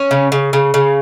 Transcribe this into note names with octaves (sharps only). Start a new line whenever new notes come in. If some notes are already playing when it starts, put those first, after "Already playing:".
Already playing: C#4
C#3
C#3
C#3
C#3